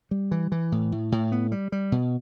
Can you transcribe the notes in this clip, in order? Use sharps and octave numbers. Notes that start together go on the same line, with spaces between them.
G3
E3
E3
A2
A2
A2
B3
G3
G3
B2